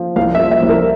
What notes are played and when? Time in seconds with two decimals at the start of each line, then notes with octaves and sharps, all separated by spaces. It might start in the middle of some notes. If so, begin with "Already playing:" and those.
Already playing: F3
0.16 C2 F5
0.35 E5
0.39 F3
0.51 E5
0.63 C2
0.69 A#4